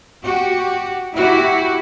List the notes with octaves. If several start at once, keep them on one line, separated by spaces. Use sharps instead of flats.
F#4 G4
E4 F#4 G4